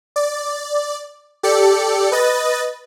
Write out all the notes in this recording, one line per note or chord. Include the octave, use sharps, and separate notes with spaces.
D5
G4 A4 D5 C#7
B4 D#5 A6